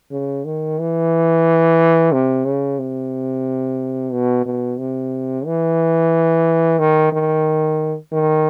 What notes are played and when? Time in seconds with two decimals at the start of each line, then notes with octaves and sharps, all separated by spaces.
0.11 C#3
0.45 D#3
0.79 E3
2.12 C3
2.45 C#3
2.79 C3
4.12 B2
4.45 B2
4.79 C3
5.46 E3
6.79 D#3
7.12 D#3
8.13 D#3